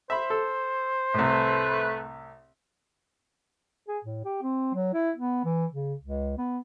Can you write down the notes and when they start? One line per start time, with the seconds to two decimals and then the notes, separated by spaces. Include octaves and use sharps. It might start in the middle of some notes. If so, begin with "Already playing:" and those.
0.10 C5 E5 B5
0.30 A4
1.14 C2 A2 A3 B4
3.88 G#4
4.04 A2
4.25 G4
4.42 C4
4.74 F#3
4.94 E4
5.16 B3
5.45 E3
5.72 C#3
6.01 C#2
6.38 B3